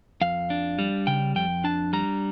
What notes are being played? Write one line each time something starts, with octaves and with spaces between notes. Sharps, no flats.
F2 F5
D4
G3
C#3 G5
F2 G5
D4 A5
G3 A#5